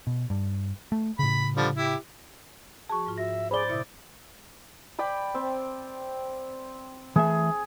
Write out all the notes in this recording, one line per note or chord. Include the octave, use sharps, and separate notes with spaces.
B2
G2
A3
A2 C#3 B5
D3 F3 G3
E4 G4
F3 F#4 G#4 A5 C#6
G#2 F4
F#4 E5 A#6
G#4 C5 D5 B5 G7
A#2 C#3 E4 D#6
D5 G5 B5
C4
E3 A3 G#4 E5